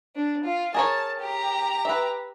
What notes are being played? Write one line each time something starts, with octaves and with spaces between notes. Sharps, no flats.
D4
F4
G#4 A#4 C#5 A5
G4 A#5
B4 E5